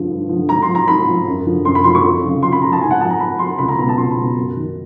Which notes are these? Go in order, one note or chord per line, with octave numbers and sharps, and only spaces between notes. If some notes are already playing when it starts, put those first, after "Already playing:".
Already playing: G2 D3 F3
G2
D3 F3
G#2 A#5
C6
F3
A#5
G#2 B5
F3
F#2
D3 F3
F#2 C6
B5
D3 F3 C6
C#6
F2
C#3 F3
F2 C6
B5
C#3 F3 A#5
A5
G#2 G#5
F#5
F3 A5
A#5
G#2 B5
F3 C6
C#2 B5
A#5
B2 A#5
A5
C#2 C6
B5
B2
F#2
D#3